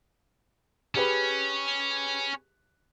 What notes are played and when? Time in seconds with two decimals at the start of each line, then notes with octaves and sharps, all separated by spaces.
0.96 C#4 G4 G#4 B4